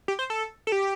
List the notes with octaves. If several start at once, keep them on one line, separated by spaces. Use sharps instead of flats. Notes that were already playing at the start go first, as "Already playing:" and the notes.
G4
C5
A4
A4
G4